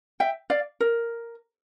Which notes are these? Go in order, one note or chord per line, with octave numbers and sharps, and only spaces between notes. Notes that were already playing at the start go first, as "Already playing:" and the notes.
E5 G5
D5 F5
A#4